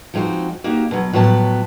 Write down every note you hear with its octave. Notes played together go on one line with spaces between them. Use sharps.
F3 G#3 C4 D#4 F#4
A#3 D#4 F#4 G4
B2 F#3
A2 F3 F#3 B3 C#5 A5